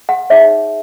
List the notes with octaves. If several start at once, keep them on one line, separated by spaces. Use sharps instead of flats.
F#5
D#4 G#4 C#5 E5